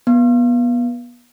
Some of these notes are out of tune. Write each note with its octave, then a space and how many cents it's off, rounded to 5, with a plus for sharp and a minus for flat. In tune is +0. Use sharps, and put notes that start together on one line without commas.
B3 -25